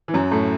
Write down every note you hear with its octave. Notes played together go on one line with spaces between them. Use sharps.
E3
F#2 F#3
A2 A3